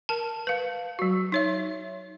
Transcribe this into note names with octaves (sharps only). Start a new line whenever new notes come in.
A#4 A5
B4 F5
F#3 F#4
D#4 C#5 E5